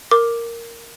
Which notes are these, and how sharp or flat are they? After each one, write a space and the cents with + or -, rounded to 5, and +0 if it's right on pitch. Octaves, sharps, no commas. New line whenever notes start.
A#4 -5 D6 +0